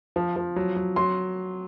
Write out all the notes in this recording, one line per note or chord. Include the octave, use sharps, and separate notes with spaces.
F3
F3
F#3
F#3
F#3 C6